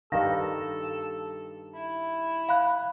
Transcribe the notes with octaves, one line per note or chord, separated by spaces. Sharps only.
G2 D#3 A4 F5 A#6
E4
F5 B5 F#6